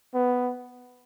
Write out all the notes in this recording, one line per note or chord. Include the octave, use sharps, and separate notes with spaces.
B3